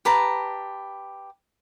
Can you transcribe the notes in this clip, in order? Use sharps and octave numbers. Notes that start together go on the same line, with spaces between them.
G4 B4 A5 A#5